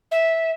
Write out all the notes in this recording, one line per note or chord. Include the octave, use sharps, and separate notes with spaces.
E5